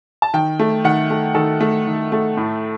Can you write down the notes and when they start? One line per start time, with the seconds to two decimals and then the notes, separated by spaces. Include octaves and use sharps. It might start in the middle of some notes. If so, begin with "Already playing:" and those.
0.22 A5
0.34 D#3 G5
0.59 A3
0.84 D#3 F#5
1.10 A3
1.35 D#3 A4
1.60 A3
1.87 D#3
2.12 A3
2.37 A2